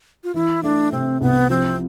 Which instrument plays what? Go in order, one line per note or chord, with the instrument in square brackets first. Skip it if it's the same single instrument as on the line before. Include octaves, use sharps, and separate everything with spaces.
[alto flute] F4
[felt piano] E3 [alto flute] E4
[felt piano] A3 [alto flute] D4
[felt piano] C3 [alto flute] C4
[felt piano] C2 [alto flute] B3
[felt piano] F3 [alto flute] C4